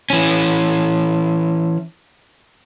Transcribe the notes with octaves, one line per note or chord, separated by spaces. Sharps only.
E3 C#4